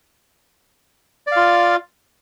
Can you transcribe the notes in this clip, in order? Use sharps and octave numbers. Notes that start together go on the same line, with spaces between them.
F4 D5 F5